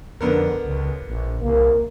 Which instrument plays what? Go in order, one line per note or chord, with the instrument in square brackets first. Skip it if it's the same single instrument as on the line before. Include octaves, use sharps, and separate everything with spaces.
[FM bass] F2 [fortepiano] D3 B3 A#4
[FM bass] C#2
A#1
[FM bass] C2 [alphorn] A#3